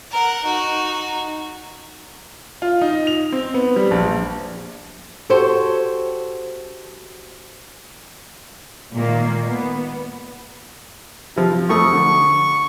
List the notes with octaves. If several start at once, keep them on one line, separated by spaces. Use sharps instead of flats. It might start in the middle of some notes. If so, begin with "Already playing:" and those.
A#4 F#5
D#4 F#4
F4
D#4
F7
C4
B3
G3
A#1
F#4 G4 A4 C5 C#5
A#2 D#3 G#3 A#3
B3
C3 F3
F2 A3 C#6 D#6
D3